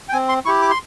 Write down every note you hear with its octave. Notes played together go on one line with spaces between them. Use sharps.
G5
C4 G#5
C6
E4 G4 C#6
D6
C6